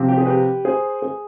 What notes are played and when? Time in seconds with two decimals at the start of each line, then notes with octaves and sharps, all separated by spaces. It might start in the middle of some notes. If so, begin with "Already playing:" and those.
Already playing: C3 F3 C4
0.09 G4
0.18 G#4
0.26 G4 B4
0.65 G#4 C5
1.02 G#4